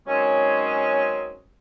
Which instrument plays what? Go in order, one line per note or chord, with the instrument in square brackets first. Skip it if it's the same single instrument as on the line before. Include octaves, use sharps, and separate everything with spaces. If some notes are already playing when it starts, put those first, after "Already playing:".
[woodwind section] D#3 F#3 G#3 C4 C#4